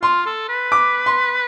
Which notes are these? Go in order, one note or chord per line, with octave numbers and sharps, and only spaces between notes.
F4 C6
A4
B4
D6
C6